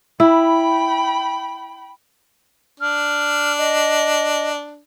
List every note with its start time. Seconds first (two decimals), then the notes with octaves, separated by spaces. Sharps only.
0.20 E4 G5 B5
2.80 D4 F6
3.58 D#5